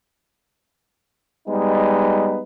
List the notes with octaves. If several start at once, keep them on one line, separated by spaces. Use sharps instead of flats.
G3 G#3 B3 D#4